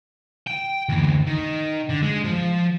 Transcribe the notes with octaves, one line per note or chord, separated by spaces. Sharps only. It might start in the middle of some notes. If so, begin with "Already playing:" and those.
G5
D2 E3
D#3
D3
G#3
F3